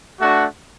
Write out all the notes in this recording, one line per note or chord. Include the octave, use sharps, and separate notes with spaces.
A3 D4 F#4